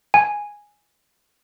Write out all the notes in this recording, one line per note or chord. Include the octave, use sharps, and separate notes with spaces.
G#5